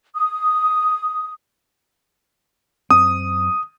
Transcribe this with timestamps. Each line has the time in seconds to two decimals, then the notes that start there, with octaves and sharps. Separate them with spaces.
0.15 D#6
2.91 F#2 C4 D#6